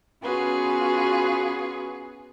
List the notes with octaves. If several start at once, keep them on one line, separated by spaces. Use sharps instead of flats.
B3 C#4 F4 F#4 G#4 B4